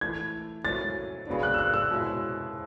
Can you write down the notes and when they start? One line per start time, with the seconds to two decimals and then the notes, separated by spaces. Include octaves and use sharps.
0.01 E3 A3 E4 G#6
0.65 F#3 C#4 E4 A6
1.27 C#3 F#3 B3 D4
1.43 F#6
1.54 E6
1.58 F#6
1.74 E6
1.90 B2 G#3 C#4 E4